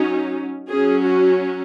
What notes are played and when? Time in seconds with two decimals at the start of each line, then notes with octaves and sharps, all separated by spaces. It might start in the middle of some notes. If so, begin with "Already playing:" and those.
Already playing: F#3 C#4 D#4
0.69 F#3 C#4 G#4
1.04 F#4